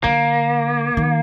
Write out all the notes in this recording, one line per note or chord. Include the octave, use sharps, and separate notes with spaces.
D3 A#3
D#3